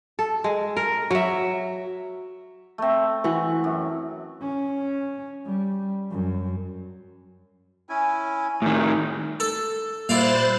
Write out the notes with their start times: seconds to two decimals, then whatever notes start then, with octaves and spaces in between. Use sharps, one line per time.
0.19 A4
0.44 G#3
0.77 A#4
1.11 F#3 E5
2.78 A3 C4
3.24 E3 F#4
3.64 F#2
4.43 C#4
5.46 G3
6.10 F#2
7.89 C#4 E4 G#5
8.62 A2 D#3 G4
9.40 A4
10.09 A#2 G3 E4 C5 D5 F5 F#6 A6